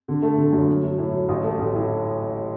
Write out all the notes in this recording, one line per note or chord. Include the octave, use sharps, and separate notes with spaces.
D3
A3
D3
F#2
F#3
F#3
A2
F#3
A1
A3
A1
A2